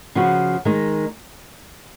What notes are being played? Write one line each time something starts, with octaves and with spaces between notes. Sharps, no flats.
C#3 F3 B3 F#4 B4
D#3 G#3 D#4